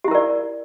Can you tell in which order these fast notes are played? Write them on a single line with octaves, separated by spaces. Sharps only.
G4 E4 A#4 D5